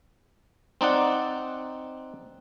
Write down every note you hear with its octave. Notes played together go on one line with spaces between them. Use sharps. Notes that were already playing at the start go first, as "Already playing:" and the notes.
C4 D#4 D5 F#5